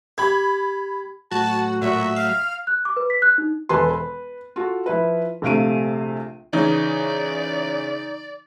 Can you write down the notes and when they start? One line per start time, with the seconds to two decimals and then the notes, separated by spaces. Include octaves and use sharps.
0.18 G4 B5 G#6
1.31 A2 F#3 F#4 F#5 A5
1.82 A#2 F#4 E5
2.16 F5 F6
2.67 F#6
2.85 D6
2.96 B4
3.10 B6
3.22 F#6
3.38 D#4
3.69 E1 A4 B4 G#5 C6
3.89 B4
4.56 F4 F#4 A4
4.86 F3 E4 B4
5.42 A#1 C3 A3 F5 D7 D#7
6.53 C#3 E3 D#4 D5